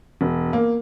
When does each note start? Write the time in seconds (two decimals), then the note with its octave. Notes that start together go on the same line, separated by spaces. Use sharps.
0.21 E1
0.53 A#3